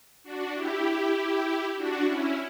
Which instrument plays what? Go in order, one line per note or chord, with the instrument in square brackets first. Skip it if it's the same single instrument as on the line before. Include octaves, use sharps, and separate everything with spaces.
[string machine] D4 F#4
E4 G4
D4 F#4
C#4 E4